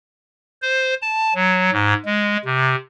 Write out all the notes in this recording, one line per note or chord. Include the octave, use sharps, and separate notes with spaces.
C5
A5
F#3
G#2
G#3
C3